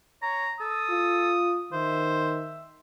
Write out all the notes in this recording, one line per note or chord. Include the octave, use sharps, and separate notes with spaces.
C#5 A#5
A4 D#6
F4
D#3 C5 E5